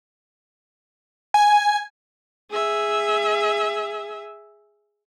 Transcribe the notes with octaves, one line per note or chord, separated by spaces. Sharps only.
G#5
G#4 E5